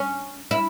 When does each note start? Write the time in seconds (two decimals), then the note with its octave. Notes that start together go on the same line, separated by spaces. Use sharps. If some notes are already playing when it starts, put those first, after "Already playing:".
Already playing: C#4
0.51 E4